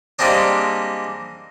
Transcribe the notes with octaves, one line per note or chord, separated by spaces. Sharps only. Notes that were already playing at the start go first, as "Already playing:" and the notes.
G3 G#3 A#3 C4 D4